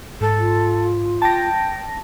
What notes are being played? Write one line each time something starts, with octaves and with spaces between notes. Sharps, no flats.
G#2 A4
F4
G5 A5 A#6